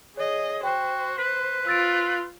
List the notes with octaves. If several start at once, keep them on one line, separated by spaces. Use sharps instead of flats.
G#4 C#5 D#5
F#4 C5 G5
B4 B6
F4 E6 A6 D7